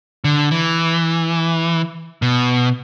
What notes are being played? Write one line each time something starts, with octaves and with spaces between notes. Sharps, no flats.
D3
E3
B2